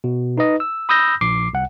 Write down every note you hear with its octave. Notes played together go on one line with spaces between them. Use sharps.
B2
D#4 B4 D#5
E6
B5 D#6 E6 G6 A#6
A#1 D6 C7
C2 F#5